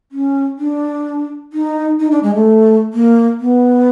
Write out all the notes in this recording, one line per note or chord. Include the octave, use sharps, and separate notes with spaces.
C#4
D4
D#4
D#4
D4
G#3
A3
A#3
B3